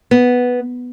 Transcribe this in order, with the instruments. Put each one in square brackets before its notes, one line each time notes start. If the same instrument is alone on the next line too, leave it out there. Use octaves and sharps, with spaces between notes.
[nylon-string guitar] B3